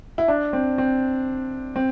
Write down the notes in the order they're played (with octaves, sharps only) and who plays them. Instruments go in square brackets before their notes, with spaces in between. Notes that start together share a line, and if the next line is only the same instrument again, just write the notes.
[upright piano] E4
D4
C4
C4
C4